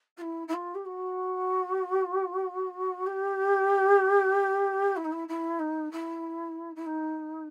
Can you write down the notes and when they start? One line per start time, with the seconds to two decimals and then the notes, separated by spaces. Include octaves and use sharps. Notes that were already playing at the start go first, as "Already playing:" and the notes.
0.17 F4
0.21 E4
0.47 E4
0.53 F4
0.74 G4
0.85 F#4
3.06 G4
4.96 E4
5.04 D#4
5.12 E4
5.28 E4
5.59 D#4
5.91 E4
6.75 E4
6.86 D#4